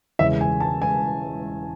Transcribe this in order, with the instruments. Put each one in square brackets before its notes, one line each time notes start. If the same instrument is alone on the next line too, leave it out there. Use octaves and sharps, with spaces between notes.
[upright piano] E1 E2 C#3 G#3 E5
G#5
A5
G#5